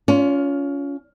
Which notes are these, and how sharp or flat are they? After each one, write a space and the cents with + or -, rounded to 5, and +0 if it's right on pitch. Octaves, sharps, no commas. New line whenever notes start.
C#4 +25 F4 +5